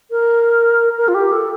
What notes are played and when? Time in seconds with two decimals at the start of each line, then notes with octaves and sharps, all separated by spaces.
0.11 A#4
0.97 A#4
1.08 F4
1.14 G4
1.33 A4